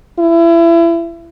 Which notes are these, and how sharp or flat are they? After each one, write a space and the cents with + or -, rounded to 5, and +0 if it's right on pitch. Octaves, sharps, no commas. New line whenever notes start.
E4 +30